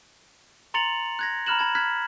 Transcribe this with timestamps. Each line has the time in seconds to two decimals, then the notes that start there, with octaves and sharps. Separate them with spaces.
0.74 A#5 C6 A6 C#7 F7 F#7
1.19 F#6 G#6 A#6
1.46 A#5 B5 F6 F#6 E7 F#7
1.59 A5 B5 G#6
1.75 F6 F#6 G#6 B6